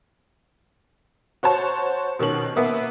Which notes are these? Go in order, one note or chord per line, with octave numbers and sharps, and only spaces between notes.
F#4 C5 C#5 A5
B2 D#3 C#4 F#7
A#3 B3 E5